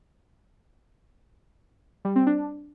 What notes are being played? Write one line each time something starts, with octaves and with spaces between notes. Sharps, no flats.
G3
C4
D4